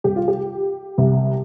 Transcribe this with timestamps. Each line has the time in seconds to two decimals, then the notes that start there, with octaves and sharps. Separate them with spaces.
0.04 C2 C3 G4
0.16 F4
0.28 G4
0.98 C2 C3